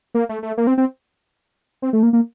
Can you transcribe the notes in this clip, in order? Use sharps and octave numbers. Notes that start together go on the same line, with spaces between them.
A#3
A3
A3
A#3
C4
C4
C4
A3
A#3
A#3